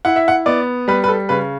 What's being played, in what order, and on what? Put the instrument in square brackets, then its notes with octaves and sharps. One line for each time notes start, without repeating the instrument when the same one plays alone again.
[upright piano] E4 F#5
E5
F#5
B3 D5
G3 B4
B4
A4
C#3 B4